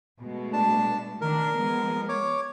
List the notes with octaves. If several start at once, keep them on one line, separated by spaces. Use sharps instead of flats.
B2 G#3 A3
D4 A5
D#3 D4 A#4
F3 G#3 B3
C#5 D6